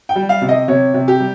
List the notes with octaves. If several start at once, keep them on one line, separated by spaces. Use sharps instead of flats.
G5
G3
F5
C3
D#5
C3 C#5
C3
G4
G3